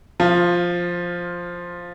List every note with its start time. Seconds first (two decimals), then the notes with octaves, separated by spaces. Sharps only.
0.20 F3 F4